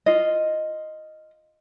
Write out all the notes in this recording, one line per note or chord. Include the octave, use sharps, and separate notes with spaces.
F4 D#5